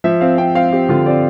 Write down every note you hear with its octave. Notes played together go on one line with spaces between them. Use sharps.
F3 E5
C4 F5
C4 G5
C4 F5
C4 G4
D3 F4
C4 D5